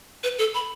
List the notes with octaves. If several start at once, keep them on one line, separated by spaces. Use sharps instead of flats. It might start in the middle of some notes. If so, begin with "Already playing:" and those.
B4
A4
B5